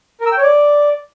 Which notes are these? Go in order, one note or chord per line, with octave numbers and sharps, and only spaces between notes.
A#4
E6
G5
C#5
D5